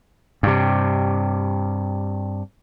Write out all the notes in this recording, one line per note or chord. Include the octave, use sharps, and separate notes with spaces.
G2 C3